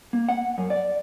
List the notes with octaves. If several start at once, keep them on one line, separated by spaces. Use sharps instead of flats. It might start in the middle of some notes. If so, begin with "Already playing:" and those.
A#3
F#5
F#2
D5